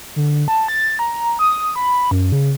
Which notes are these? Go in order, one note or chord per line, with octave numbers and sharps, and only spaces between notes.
D3
A5
A6
A#5
D#6
B5
F#2
C#3